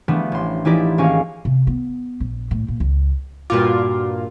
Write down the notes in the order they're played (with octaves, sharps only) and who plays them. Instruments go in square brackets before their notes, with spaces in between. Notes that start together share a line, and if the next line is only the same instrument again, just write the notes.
[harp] E3 F3 G3 A3 B3 D4
A1 C6
E3 F3 D#4 E4 G4 D5
G#1 A#3 C#4 F5 G#5 C#6
[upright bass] C3
B3
A#1
A2
A#2
C#2
[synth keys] G2 A#2 F4 [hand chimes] F#4 D6